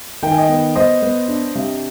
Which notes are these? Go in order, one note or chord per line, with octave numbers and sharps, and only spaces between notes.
D#3 G5
G#5
D#5 G5
B3
B3 C5 D#5
B3
D4
C3